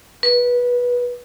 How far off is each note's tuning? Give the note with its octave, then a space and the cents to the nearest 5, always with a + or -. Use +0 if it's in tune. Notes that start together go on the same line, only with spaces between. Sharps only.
B4 -15